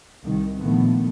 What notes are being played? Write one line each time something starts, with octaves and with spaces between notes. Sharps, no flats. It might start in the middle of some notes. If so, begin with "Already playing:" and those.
C2 D#3
A#2 D3 D#3 F3 A3 B3